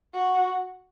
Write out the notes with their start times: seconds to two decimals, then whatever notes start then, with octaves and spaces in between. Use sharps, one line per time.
0.14 F#4